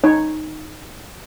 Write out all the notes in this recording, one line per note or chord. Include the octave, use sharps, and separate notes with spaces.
D#4 C#5